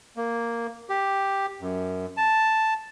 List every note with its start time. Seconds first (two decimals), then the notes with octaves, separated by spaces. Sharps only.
0.16 A#3
0.89 G4
1.61 F#2
2.17 A5